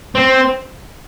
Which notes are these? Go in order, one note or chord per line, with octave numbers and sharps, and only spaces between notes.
C4